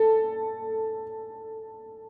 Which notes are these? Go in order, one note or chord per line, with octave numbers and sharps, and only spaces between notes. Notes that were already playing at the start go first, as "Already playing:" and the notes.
Already playing: A4